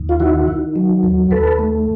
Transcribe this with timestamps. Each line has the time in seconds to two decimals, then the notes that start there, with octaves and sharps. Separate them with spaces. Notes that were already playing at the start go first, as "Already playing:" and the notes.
Already playing: D#2
0.09 F4
0.20 D#3 E4 F#4
0.48 D#3
0.76 F#3
1.04 D#2
1.31 D#2 A4 B4
1.59 A3